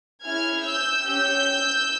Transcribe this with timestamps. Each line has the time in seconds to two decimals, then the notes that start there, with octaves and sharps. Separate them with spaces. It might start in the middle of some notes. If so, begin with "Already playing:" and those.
0.23 C#4 E4 G#4 F6 G#6
0.64 E6 G6
1.04 C#4 G4 E6 G6